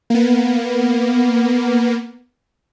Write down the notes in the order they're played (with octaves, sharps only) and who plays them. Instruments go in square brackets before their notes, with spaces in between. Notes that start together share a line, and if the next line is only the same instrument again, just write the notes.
[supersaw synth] A#3 B3